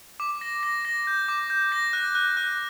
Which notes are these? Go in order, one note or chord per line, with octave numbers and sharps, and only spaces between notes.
D6
A#6
A#6
A#6
G6
D6
G6
A#6
F#6
F#6
F#6